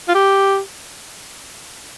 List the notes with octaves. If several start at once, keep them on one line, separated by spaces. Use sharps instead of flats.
F4
G4